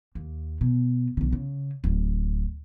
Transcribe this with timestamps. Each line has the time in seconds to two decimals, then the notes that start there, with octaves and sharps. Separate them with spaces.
0.15 D#2
0.61 B2
1.17 B1 D3
1.33 C#3
1.84 D1